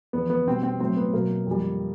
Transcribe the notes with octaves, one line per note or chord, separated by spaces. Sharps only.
E2 C#3 F3 B3
B3
B2 G3 C4
C4
A2 F#3 C4
B3
B2 F#3 A#3
F2 D3 G3